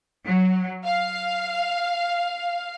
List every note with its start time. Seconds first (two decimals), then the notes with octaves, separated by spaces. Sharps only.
0.25 F#3
0.85 F5